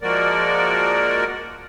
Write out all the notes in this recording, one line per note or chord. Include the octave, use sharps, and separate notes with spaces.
F3 G#3 A#3 F#4 A#4 D5